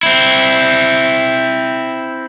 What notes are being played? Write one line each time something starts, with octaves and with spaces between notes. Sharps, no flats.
C4 E4